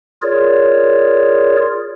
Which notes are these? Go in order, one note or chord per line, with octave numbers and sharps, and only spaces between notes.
F4 G#4 A#4 C#5 D5